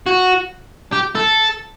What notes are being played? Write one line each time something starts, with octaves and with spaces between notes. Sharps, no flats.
F#4
G4
A4